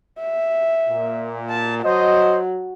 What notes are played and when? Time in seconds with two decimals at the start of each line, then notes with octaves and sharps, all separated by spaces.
0.21 E5
0.88 A#2
1.50 A5
1.84 F#3 C5 D#5